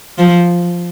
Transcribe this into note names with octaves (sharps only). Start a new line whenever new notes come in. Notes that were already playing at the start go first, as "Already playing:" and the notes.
F3